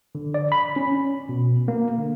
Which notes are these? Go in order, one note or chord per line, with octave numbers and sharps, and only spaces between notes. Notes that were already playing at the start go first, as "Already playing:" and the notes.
D3
D5
B5
C#4
B2
A#3
D3